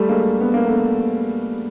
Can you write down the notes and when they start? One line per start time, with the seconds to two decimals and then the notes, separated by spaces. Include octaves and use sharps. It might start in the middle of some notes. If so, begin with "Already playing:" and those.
Already playing: G3 A3
0.08 G#3 A#3
0.41 B3
0.54 A#3
0.67 A3 B3